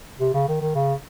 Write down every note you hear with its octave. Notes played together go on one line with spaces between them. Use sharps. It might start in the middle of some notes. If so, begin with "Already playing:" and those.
C3
C#3
D#3
D#3
C#3